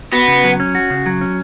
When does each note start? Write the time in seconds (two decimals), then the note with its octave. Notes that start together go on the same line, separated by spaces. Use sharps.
0.12 B3 F#4
0.28 C#3
0.44 F#3
0.60 C#4
0.75 F#4
0.90 C#3
1.06 F#3
1.21 C#4